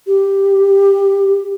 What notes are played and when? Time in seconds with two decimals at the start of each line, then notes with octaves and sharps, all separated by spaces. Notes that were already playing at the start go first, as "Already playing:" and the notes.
0.07 G4